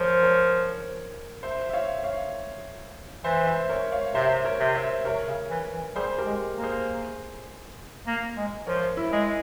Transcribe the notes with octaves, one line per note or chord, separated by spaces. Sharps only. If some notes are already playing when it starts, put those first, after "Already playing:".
Already playing: F3 G#4 A#4 C5 C#5
A#4 C#5
C5 E5
E5
C#5 F5
C#5 F5
E3 C5 E5
C5 E5
A#4 C#5
C#5 F5
C3 C5 E5
A#4 C#5
C3
C5 E5
C3 A#4 C#5
C#3
E3
E3
G3 G#4 C5
G4 A#4
G#3
A#3
G#4 C5
A#3
G#3
F3 A#4 C#5
E4
G#3